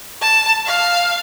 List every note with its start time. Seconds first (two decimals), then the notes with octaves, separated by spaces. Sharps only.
0.22 A5
0.66 F5